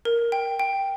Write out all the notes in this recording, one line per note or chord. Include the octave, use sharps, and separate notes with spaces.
A#4
G5
G5